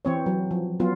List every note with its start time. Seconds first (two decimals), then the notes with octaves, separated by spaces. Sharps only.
0.05 E3 C4 C#5
0.26 F#3
0.51 F3
0.80 F#3 B3 F4